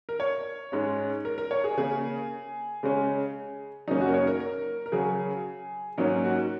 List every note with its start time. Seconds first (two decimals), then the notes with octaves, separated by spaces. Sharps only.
0.09 A#4
0.20 C#5
0.72 G#2 G#3 C#4
1.25 A#4
1.38 A#4
1.51 C#5
1.64 G#4
1.77 C#3 A#3 C#4 G#4
2.83 C#3 G#3 C#4
3.88 F#2 C#3 A#3 C#4 D#4
4.01 F#4
4.08 A#4
4.14 C#5
4.27 A#4
4.40 A#4
4.86 A#4
4.92 C#3 F#3 C#4 G#4
5.98 G#2 F#3 A#3 C#4 D#4
6.25 F#4